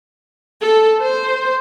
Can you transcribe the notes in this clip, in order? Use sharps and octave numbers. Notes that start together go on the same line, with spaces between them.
A4
C5